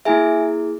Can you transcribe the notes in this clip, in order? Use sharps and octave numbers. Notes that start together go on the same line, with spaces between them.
A#3 E4 G#4 E5 G#5